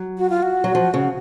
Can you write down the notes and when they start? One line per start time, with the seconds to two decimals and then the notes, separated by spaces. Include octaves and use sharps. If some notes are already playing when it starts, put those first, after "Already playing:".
Already playing: F#3
0.18 F#4
0.30 F4
0.43 F#4
0.64 F#3
0.75 F3
0.94 C#3